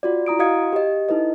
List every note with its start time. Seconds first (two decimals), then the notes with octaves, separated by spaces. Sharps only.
0.03 F4 F#4 D5
0.26 E4 A#5 D#6 D7
0.39 F#4 D#5 F5 D#6 G#6 C#7
0.73 G4 D#5
1.09 D#4 E4 A4 B4 D#5